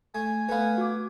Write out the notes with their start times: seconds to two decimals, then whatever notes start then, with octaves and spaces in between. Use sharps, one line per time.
0.15 A3 G#5
0.49 A3 B3 B4 F5
0.78 F#4 D6